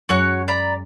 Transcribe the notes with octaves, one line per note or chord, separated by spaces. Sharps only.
F#2 G#3 F#4 C#5 G#5 F#6
D5 A#5 B5